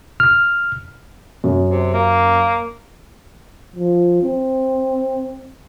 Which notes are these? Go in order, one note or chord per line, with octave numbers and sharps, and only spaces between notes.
F6
F#2
C3
A#3
F3
C4